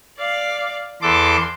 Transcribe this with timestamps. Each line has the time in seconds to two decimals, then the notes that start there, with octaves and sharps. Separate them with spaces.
0.18 D5 F5
1.02 E2 A4 C6 D6